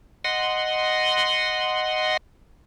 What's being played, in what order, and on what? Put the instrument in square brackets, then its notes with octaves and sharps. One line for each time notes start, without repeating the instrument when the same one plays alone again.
[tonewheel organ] D#5 F#5 C6